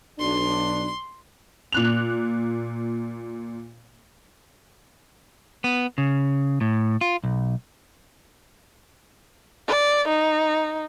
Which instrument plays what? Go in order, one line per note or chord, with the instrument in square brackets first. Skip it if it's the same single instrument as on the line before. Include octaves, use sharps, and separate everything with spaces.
[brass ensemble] B1 D4 [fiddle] C6
[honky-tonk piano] A#2 F#6 F7
[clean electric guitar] B3
C#3
A2
F4
B1
[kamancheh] D5
D#4